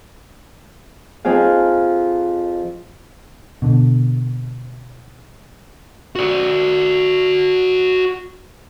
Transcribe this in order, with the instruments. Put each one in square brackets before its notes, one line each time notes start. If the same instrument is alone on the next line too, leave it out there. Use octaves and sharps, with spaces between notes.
[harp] F2 C4 D#4 G#4 F5
[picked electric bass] B2 D3
[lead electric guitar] F#4 D5